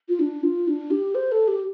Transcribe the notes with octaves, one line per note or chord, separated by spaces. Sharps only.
F4
D4
F4
D4
G4
C5
A4
G4